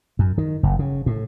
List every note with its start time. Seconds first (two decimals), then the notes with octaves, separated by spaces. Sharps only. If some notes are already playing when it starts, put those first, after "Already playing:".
0.19 F#2
0.38 D#3
0.63 F#1
0.79 C#3
1.06 A2